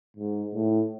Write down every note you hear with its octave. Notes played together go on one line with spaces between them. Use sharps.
G#2
A2